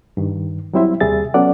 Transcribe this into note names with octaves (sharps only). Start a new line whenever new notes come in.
G2 D#3
F#3 G3 C4 E4 C5 E5
D#2 C3 G3 G#4 E5 A6
F#3 B3 C#4 A4 D5 F#5